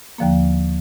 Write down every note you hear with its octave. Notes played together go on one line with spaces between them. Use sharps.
D#2 D3 F3 A#3